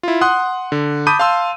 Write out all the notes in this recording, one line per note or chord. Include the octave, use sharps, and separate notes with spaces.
E4 F4
F#5 C6 D#6 F#6
D3
A5 B5 D6 D#6 G6 D#7
F5 A5 C6 E6